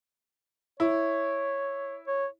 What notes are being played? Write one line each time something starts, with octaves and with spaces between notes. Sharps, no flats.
E4 C#5
C#5